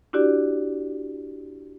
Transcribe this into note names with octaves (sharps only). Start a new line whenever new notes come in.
D4 E4 F#4 G4 D5